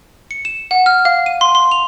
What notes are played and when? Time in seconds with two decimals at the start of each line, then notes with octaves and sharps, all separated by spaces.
0.31 C#7
0.45 E7
0.71 F#5
0.86 F6
1.05 F5
1.26 D#7
1.41 C6
1.55 C6
1.71 F7